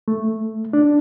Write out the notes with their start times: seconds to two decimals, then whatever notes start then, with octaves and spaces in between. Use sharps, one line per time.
0.08 A3
0.73 D4